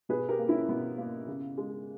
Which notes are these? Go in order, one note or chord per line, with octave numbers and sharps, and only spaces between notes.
B2 G#4 B4
G4 A#4
A#3
C#4 E4
B2 B3
A#3
C#3
G#3